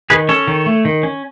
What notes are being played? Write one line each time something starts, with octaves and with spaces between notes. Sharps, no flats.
D#3 G#4 B4
C#4 A4 C#5
D#3
A3
D#3
C#4